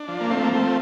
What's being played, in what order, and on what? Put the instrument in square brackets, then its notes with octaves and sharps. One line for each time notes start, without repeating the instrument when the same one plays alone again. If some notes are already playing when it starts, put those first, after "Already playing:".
Already playing: [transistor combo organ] D4
F3
A#3
F3 A3 C4
A#3
F3 A3 C4